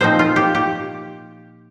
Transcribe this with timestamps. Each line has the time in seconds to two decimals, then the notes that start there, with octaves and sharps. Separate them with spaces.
0.01 A#2 F3 C4 D#4 C5
0.19 F4
0.36 G4
0.55 G4